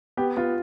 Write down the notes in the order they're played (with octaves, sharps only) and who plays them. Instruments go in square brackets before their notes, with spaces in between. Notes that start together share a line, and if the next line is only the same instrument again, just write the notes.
[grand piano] B3 [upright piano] G4
[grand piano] B3 [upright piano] F4